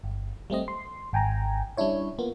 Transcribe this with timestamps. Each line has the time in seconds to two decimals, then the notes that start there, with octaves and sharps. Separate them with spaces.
0.04 G1
0.50 G3 A3 C4 D#5
0.68 C6
1.13 G#1 G5 G#5 A#5
1.77 G3 C#4 D4 E4 C#5
2.19 A#3 B3 F4